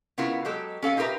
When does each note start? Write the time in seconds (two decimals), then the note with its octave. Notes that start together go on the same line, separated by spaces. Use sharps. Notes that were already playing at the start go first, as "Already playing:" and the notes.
0.18 C#3 B3 E4 F4 A#4
0.45 F#3 G#3 G4 A4
0.82 C#4 A4 F5 G#5
0.97 D#4 F4 G4 A#4 B4 E5